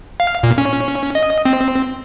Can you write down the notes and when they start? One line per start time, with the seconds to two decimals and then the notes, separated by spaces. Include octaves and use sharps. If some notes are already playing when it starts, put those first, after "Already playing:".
0.20 F5
0.43 A#2
0.58 C#4
1.15 D#5
1.45 C4